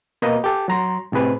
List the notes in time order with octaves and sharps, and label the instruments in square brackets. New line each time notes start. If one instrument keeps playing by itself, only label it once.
[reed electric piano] B2 A#3 B4 D#5 A#5
G4 A4
F#3 A#5 C6
A2 C3 G#4 B4